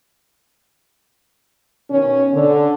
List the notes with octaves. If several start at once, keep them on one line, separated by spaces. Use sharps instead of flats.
B2 D#3 C#4
D3